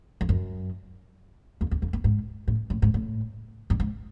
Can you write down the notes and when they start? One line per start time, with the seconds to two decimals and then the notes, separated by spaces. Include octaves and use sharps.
0.21 F2
0.29 F#2
1.61 F2
1.71 E2
1.82 F2
1.93 G2
2.04 G#2
2.48 A2
2.70 A2
2.82 G#2
2.94 A2
3.70 G2
3.80 G#2